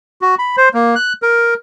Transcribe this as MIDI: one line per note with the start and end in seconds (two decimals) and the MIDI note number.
0.21 0.35 66
0.39 0.56 83
0.57 0.69 72
0.74 0.95 58
0.95 1.13 90
1.22 1.54 70